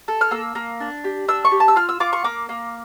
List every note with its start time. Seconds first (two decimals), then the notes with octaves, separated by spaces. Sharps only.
0.08 A4
0.21 F6
0.31 A#3 E6
0.55 A#3
0.80 D4
1.04 G4
1.28 D4 E6
1.45 C#6
1.52 G4
1.60 A5
1.68 E6
1.76 F4 F6
1.89 E6
2.00 F4 D6
2.13 C#6
2.24 A#3 D6
2.49 A#3